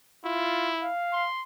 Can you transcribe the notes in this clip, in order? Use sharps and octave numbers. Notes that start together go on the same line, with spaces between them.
E4 F4
F5
C6